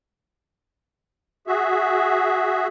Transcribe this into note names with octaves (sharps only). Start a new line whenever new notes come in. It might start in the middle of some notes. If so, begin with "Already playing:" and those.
F#4 G#4 E5